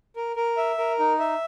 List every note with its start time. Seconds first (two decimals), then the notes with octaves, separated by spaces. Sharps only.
0.16 A#4
0.36 A#4
0.57 E5
0.78 A#4
0.99 D#4
1.19 E5